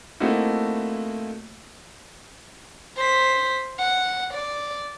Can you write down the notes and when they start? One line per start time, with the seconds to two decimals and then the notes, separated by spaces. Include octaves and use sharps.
0.20 A3 A#3 C4 D#4 E4 F#4
2.97 C5 B6
3.79 F#5
4.34 D5